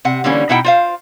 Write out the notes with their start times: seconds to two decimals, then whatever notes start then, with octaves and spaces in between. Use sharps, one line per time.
0.05 C3 F#5
0.24 D3 E3 G3 A#3 C#4
0.49 B2 D#4 E4 F#5 G5
0.65 F4 C5 F5